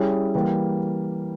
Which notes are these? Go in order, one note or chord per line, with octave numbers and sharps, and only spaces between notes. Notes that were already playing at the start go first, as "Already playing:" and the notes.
Already playing: G3 C#4 E4 G#4
E3 G3 A#3